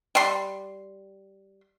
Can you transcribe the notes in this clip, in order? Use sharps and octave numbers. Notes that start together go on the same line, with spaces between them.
G3 C6